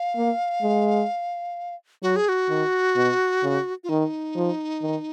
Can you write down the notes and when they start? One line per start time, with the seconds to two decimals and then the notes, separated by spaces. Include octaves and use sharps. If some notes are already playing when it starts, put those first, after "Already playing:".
Already playing: F5
0.16 A#3
0.62 G#3
2.02 F#3 F#4
2.16 G#4
2.29 F#4
2.49 D#3
2.96 B2
3.43 C#3
3.84 F4
3.89 D#3 D#4
4.35 F3
4.82 D#3